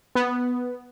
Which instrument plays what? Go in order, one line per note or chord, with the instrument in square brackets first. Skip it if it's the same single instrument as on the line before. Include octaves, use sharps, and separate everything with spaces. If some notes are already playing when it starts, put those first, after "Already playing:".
[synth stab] B3